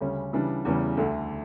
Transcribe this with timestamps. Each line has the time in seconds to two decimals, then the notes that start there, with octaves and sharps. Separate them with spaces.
0.01 D2 C#3 G3 C#4
0.33 C#3 E3 G3 D4
0.65 E2 C#3 E3 G3
0.97 D2 D3 A3